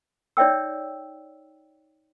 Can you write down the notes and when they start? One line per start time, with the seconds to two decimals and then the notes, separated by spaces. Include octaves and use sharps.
0.37 D#4 C#5 D5 E5 G5 E6